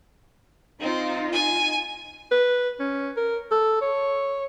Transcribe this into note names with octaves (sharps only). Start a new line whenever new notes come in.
C4 D#4 F4
G#5
B4
C#4
A#4
A4
C#5